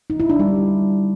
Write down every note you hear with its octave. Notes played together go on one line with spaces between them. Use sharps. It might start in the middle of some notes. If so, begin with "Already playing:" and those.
D#4
E4
D4
G3